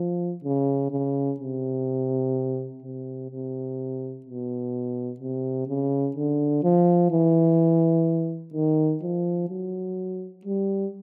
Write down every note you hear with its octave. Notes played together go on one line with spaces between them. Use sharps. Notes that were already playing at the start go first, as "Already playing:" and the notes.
Already playing: F3
C#3
C#3
C3
C3
C3
B2
C3
C#3
D3
F3
E3
D#3
F3
F#3
G3